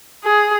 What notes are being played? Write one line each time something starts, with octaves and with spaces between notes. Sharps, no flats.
G#4